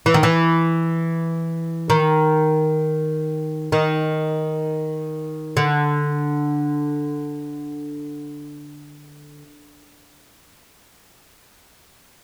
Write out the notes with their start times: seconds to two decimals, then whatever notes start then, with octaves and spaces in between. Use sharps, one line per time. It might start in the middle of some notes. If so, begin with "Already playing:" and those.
0.06 E3
0.14 D#3
0.23 E3
1.90 D#3
3.72 D#3
5.57 D3